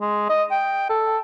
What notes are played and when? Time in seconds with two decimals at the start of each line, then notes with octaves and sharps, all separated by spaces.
0.01 G#3
0.29 D#5
0.51 G5
0.89 A4